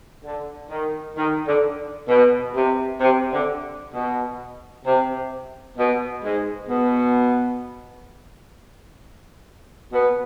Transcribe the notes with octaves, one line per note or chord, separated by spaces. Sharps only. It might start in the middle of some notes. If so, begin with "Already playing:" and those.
D3
D#3
D#3
D3
B2
C3
C3
D3
B2
C3
B2
G#2 G#3
B2 B3
B2 B3